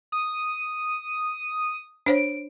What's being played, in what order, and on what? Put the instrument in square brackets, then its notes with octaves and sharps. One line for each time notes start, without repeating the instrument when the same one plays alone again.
[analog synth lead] D#6
[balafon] D4 C5 C#5 [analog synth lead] D7